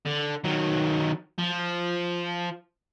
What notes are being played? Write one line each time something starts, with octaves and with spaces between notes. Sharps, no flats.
D3
D#3 F#3
F3